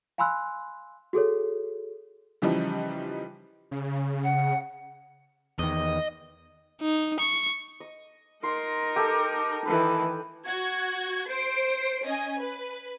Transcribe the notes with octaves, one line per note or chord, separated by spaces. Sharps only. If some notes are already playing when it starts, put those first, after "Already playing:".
F5 G#5 B5 C6 E6 F#6
F#4 G#4 A4 C#5
C#3 E3 F3 G3 D#4
C#3
F#5
E2 D#3 D#5
D#4
C#6
D#5
D#4 A#4 C6
G4 A4
D#3 E3 A4 B4 B5
F#4 G#6
C5 C7 D7
C#4 D#5 G#5
B4